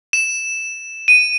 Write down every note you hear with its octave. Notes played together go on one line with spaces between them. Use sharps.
E7
D#7